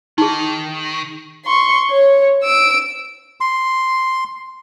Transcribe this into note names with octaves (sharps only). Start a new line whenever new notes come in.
D#3 D#4 G#4
C6 C#6
C#5
E6 D7
C6